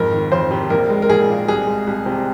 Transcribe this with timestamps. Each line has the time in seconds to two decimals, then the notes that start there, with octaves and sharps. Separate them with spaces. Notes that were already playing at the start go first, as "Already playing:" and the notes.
Already playing: F2 G#2 A#4
0.12 D#3
0.32 F2 C5
0.51 C3
0.70 A#1 A#4
0.89 G#3
1.02 A#4
1.09 A#1 G#4
1.29 A#2
1.48 C2 G#4
1.67 G#3
1.87 C2
2.06 C3